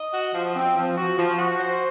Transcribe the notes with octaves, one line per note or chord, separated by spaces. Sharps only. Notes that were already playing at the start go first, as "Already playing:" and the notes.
Already playing: D#5
F#4
F3
C4
F3
F#4
F3
F#4
C5